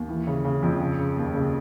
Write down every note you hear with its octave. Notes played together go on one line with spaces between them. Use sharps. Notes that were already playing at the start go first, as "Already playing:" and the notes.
Already playing: D#2
E3
C#3
C#3
F2
C#3
C#3
D#2
C#3